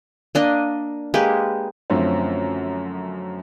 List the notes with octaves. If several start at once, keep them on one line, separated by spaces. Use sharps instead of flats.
A#3 D4 D#5
G#3 A#3 G4 B4
F#2 D3 F3 A3 C4 C#4